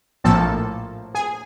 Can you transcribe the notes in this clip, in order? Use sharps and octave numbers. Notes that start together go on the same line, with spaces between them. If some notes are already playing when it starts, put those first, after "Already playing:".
A#1 A2 F3 A#3 A4 A5
G#4 G#5